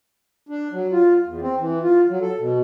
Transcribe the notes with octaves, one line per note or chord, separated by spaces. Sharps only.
D4
F#3
F4
E2
C4
E3
F4
F#3
A4
B2